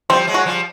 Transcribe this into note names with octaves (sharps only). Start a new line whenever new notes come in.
F3 G3 C4
F#3 G#3
F#4
F3 G3